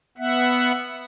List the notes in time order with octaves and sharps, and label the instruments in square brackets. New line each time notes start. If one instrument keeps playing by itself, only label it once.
[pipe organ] B3 E5 F#5